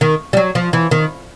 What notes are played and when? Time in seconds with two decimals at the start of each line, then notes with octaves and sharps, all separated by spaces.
0.01 D#3
0.33 G3
0.37 F#3
0.55 F3
0.73 E3
0.91 D#3